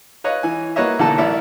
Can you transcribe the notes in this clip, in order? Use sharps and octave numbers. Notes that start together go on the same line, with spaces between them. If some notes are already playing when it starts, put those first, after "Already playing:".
B4 C#5 D#5 F5
E3 G#5
A#3 F#4 B4 C#5 D#5 E5
B1 D3 E3 A#3 A4 A5
A1 E4 A#4 D5 E5